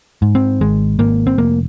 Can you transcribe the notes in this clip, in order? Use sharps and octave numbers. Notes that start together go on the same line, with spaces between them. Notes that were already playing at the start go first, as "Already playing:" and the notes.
G#2
C4
G#1 G#3
G#1 A#3
C4
F1 A#3